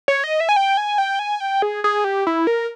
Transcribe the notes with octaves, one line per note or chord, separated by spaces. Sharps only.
C#5
D#5
E5
G#5
G5
G#5
G5
G#5
G5
G#4
G#4
G4
E4
A#4